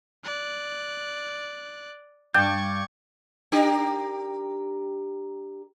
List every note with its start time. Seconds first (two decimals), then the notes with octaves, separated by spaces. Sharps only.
0.25 D5 F#6
2.34 G2 D5 F5 G5 A5 C#6 G6 G#6
3.52 D4 G4 A#4